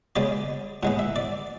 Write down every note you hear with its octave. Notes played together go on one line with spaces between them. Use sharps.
C#3 G#3 B3 D5
A2 G#3 B3 F#5
E5
D5